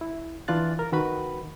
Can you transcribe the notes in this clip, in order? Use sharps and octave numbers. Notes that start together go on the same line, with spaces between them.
E4
E3 D4 F4 F#6 A6
A#4
D#3 F#4 B4 B5